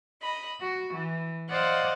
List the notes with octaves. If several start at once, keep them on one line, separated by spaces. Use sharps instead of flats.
D#5 B5
F#4
E3
C5 D5 D#5 F5 F#5